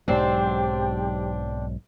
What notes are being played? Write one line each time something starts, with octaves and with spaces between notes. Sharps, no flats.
B1 G#2 F#3 C4 D4 G4